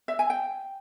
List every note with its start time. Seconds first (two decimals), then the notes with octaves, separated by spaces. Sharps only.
0.08 E5
0.19 G#5
0.30 G5